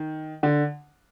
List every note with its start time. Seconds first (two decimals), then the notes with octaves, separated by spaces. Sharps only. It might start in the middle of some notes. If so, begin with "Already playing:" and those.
Already playing: D#3
0.43 D3